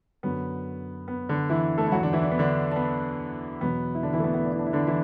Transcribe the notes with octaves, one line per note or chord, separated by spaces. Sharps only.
F#2 D3 F#3 B3
B3
D3 D4
E3 E4
A3 A4
E4
E2 E3 F#3 F#4
D3 D4
E3 E4
D4
B3
D3 D4
D4
B3
E2 B2 F#3 B3
E4
D3 D4
E3 E4
A3
B3
B3
D4
E4
D4
E4
D3 D4
E3 E4